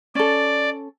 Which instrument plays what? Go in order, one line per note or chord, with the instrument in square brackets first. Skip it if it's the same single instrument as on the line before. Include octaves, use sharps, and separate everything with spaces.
[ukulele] C#4 A4 [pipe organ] D5